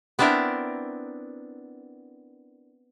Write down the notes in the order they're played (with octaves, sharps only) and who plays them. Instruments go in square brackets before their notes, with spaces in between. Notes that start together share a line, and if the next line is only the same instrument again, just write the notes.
[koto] B3 C4 D4 E4 A#4